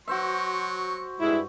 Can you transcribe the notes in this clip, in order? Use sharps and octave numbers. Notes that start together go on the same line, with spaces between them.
F#3 F#4 C5 E5 C#6
G2 G#3 E4